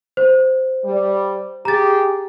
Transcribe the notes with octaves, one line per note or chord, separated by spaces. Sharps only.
C5
G3
G4 G#4 A#5 A6